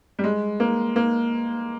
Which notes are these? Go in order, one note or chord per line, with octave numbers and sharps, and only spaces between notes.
G3
G#3
A#3
A#3